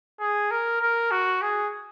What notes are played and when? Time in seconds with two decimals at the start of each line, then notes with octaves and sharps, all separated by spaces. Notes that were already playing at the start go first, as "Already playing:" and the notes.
0.20 G#4
0.51 A#4
0.81 A#4
1.11 F#4
1.42 G#4